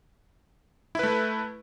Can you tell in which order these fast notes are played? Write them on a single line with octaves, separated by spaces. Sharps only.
E4 B4 A3